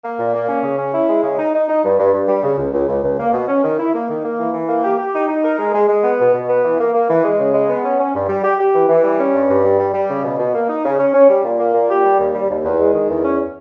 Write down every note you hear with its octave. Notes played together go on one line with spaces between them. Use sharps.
A#3
A#2
A#3
C#4
C#3
C#4
E4
G#3
C#3
D#4
D#4
D#4
G2
G2
G2
G3
C#3
C#2
C#2
C#2
C#2
A#3
B2
C#4
D#3
E4
A#3
D#3
A#3
E3
E3
A#3
G4
G4
D#4
D#4
A#4
G#3
G#3
G#3
B3
B2
B2
B3
E3
A#3
A#3
E3
G#3
C#3
G#3
B3
C#4
C#4
G2
G3
G4
G4
E3
E3
G3
C#4
G2
G2
G3
G3
G3
C#3
B2
B2
A#3
D#4
C#3
C#4
C#4
G3
A#2
A#3
A#2
G4
G3
D#2
G3
D#2
E2
G#3
D#3
E2
C#4